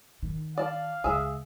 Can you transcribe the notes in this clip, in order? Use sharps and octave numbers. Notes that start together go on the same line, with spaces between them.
D#3
D5 F5 A5
C#2 G#4 E5